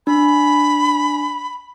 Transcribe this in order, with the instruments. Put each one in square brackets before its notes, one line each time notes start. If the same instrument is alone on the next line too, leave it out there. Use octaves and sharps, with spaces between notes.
[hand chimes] D4 [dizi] B5